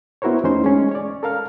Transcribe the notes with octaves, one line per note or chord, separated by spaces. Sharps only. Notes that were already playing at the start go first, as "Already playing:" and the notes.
B3 E4 F#4 A#4 C5 C#5
E2 A3 C#4 D#4 C5 C6
G#3 C#4
C#5 D5
A4 A#4 F5 F6